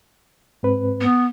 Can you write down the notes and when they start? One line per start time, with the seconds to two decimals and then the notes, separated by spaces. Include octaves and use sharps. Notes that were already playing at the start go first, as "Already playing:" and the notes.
0.63 G#2 C4 B4
1.01 B3